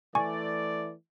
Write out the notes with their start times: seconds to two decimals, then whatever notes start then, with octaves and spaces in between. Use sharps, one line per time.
0.15 E3 A3 D5 G#5 C#6